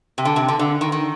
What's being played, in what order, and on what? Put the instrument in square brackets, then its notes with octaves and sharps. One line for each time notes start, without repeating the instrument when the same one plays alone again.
[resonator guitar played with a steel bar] C3
D3
C3
D3
D3
D#3
D#3